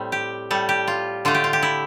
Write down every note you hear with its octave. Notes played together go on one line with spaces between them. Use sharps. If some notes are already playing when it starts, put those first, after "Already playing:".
Already playing: A2 G3 C4
G4
A2 G3 A4
G4
F4
D3 A3 F4
G4
F4
G4
E4